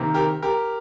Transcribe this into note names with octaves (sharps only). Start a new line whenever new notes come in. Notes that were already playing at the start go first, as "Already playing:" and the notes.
Already playing: C3 D#3 A#3
G4 A#4
G4 A#4